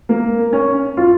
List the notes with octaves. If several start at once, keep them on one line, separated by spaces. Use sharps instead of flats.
A#3
C#4
F4